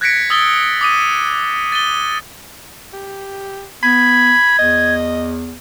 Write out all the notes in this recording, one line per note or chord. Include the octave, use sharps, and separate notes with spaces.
F#6 G#6 A#6 B6 C#7 D7
D#6 E6 G#6 A6 G7
D6 D#6 D#7
A6 D#7 G7
G4
B3 B5 G#6
E2 D#5